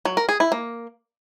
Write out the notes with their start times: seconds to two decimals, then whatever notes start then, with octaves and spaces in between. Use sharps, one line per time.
0.05 F#3
0.17 A#4
0.29 G#4
0.40 E4
0.52 A#3